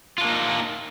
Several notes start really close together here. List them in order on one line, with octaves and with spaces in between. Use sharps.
F4 D4 A#3 D#4